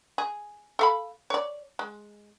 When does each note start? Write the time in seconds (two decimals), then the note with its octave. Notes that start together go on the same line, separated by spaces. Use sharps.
0.18 G#4
0.79 A4 F5 B5
1.30 C#5 D5
1.79 G#3